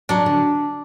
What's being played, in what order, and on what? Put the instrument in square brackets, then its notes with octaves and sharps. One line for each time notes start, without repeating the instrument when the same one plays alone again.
[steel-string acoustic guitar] F#3 [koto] D4
[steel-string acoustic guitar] D3